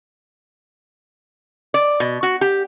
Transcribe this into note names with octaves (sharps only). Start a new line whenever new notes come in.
D5
B2
F#4
G4